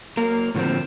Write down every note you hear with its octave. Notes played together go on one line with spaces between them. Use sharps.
F#3 A#3 A#4
A2 D3 F3 A#3 C4